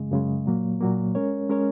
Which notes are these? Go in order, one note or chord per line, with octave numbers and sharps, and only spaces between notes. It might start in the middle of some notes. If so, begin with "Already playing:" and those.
Already playing: F#2 C#3 G#3
F#2 C#3 G#3
A#2 F#3 A#3
A#2 F#3 A#3
G#3 C#4 A#4 C#5
G#3 C#4 A#4 C#5